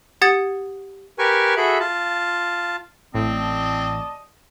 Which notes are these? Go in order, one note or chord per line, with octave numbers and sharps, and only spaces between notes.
G4 F#5 D#6 G#6 A6 C#7
G4 A#4 B4 G#5 C#6
F#4 G#4 A4 E5 B5
F4 A5
A1 A2 C4 D5 D#5 A5